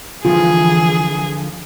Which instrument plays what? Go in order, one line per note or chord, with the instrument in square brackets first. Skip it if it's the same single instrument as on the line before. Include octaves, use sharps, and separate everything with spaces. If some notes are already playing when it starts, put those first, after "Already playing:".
[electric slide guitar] D3 F3 [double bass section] E3 [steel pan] F4 [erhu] G#4